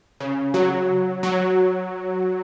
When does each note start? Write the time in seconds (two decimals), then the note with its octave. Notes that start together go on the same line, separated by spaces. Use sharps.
0.20 C#3
0.54 F#3
1.23 F#3